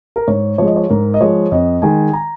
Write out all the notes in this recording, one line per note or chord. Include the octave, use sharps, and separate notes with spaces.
A#4
G#2 C#5
F3 G#3 C#5
D#5
C#5
G#2 A#4
D#5
F3 G#3 C#5
F2 D#5
D#3 G#3 G#5
A#5